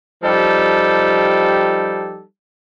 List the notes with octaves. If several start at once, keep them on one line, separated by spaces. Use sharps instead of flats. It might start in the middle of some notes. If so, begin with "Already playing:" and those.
F3 G3 D#4 G4 A4